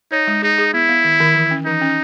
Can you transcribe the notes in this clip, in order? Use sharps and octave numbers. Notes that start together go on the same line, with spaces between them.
D#4 C#5
G#3
D#4 G#4
G#4
B3 E4
B3
D#3
D#3
E3
C#4
E3 D#4
C#4